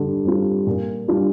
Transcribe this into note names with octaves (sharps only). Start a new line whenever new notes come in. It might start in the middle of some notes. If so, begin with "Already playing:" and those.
Already playing: D3 G3
G3 C4 F4
A#2
G3 D4 F4